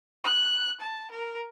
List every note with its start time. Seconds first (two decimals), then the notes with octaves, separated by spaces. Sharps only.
0.24 F#6
0.80 A5
1.11 A#4